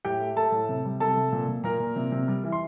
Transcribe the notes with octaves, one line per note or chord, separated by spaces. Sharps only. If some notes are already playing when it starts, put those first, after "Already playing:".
A2 G4 G5
A3
A3 A4 A5
A2
C3
G3
C3 A4 A5
C3
A#2
A#2
A#2 A#4 A#5
A#2
C3
C3
G3
E3
C6